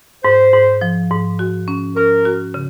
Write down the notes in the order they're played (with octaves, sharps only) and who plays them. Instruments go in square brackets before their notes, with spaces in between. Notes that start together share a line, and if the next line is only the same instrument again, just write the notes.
[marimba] G#2 [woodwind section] C5
[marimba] G#2
F3
G#2
F#4
C#4
[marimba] C#4 [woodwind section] A#4
[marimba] F#4
C#3